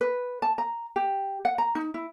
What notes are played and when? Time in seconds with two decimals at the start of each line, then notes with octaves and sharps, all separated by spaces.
0.01 B4
0.42 A5
0.58 A#5
0.96 G4
1.45 F#5
1.58 A#5
1.75 D#4
1.94 E4